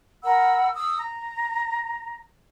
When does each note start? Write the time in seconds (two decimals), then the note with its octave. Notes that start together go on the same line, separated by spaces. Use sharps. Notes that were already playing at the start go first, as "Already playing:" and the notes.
0.22 A#4 F#5 B5 E6
0.74 D#6 E6
0.97 A#5